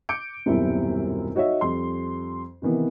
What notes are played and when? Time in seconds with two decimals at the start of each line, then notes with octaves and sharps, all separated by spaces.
0.09 D6 G6 C#7 D7
0.46 D#1 F#2 B2 G3 C4 E4
1.35 D#4 F#4 C#5 D#5 E5
1.61 F2 G3 C6
2.62 C3 D#3 E3 B3